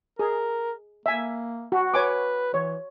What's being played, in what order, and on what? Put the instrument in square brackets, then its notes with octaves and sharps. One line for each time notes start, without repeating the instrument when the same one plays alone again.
[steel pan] G#4 [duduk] A#4
[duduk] A#3 [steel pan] E5 G#5
[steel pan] F#4
[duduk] B4 [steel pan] C#5 G#5 D6
[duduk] E3 [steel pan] C#5